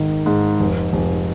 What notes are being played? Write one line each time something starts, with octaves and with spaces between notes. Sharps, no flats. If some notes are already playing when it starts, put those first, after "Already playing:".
Already playing: G#1 G#2 D#3
G#2
F1
F1